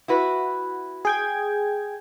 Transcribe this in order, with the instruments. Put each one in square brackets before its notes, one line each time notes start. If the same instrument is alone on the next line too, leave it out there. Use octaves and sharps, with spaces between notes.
[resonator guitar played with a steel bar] E4 F#4 B4
[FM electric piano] G#4 G5 G#6